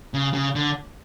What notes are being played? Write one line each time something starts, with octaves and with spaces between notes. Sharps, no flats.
C#3
C#3
D3